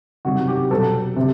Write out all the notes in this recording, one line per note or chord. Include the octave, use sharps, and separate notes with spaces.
C3 D#3 F#3 F#4
G4
B2 F#3 A4
C3